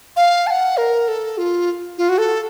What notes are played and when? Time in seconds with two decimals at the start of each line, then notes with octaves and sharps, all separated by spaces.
0.16 F5
0.47 A5
0.51 F#5
0.77 A#4
1.08 A4
1.38 F4
1.98 F4
2.09 F#4
2.18 A4